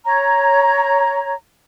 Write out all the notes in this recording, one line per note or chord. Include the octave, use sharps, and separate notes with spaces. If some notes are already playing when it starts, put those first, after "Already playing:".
C#5 A#5